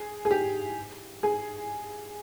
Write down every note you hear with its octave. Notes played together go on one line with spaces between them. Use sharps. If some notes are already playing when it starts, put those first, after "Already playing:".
Already playing: G#4
G#4
G4
G#4